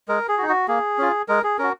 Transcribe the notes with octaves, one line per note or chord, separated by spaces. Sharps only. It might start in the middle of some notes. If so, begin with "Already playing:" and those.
G#3 A#4
G#4
F#4
D#4
F#4
A#3 G#4
C#4 F4
G#3 A#4
G#4
C#4 F#4 A#4